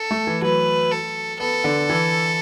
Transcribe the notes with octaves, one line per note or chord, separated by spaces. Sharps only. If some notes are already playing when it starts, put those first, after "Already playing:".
Already playing: A4
A3
E3
F#3 B4
A4
B3 A4
D3
E3